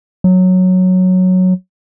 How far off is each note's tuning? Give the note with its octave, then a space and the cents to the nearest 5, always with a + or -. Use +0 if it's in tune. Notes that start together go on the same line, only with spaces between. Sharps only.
F#3 -5